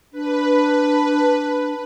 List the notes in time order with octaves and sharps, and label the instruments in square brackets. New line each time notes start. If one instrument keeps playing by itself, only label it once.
[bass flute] D4 [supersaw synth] B4